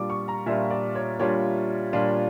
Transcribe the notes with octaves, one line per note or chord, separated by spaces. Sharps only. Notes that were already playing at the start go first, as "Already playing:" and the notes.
Already playing: A#2 G3 D4 F4 D6
C#6
A#5
A#2 G3 D4 F4 E5
D5
C#5
A#2 G3 D4 F4 C#5
A#2 G3 D4 F4